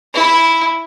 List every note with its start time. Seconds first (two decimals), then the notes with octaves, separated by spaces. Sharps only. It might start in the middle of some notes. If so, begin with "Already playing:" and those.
0.14 E4